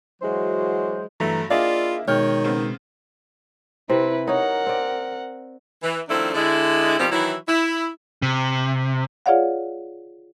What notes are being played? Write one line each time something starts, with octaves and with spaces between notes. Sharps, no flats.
E3 F#3 G#3 F#4 C5
G2 E3 F#3 A3 E5 A#5
A#3 D4 E4 F4 G#4 D5 D#5 F5
B2 D#3 G#3 C#5 G5 F6 G6
C#3 B3 C4
C3 C4 E4 B4 C5
D#4 A#4 C#5 F#5
C4 D5
E3
D#3 F3 A3 C4 D4 E4
D3 G#3 E4
B2 D#3 F3 G3 C4 G4
D#3 E3 F#3 E4
E4
C3
F4 G#4 C#5 D5 F5 F#5